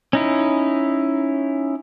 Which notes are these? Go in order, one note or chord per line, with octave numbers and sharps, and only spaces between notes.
C#4 D#4 E4